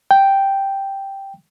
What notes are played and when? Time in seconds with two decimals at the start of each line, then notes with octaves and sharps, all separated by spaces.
0.11 G5